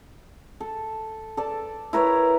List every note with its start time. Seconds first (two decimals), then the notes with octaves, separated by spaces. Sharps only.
0.60 A4
1.37 A4 D5
1.93 E4 A#4 B4 C#5